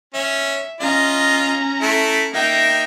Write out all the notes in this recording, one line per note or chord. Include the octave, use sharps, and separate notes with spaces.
C#4 E5
C#4 F4 D#5 A#5
A3 E4 A4
A#3 D#4 E5 G5